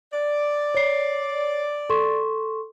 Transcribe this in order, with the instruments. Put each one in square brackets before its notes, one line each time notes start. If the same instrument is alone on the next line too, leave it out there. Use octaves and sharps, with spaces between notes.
[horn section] D5
[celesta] C#5 C7
A4 C6 C#6